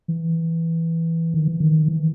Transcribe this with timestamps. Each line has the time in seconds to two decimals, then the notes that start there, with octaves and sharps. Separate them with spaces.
0.08 E3
1.34 D#3
1.48 E3
1.60 D#3
1.88 E3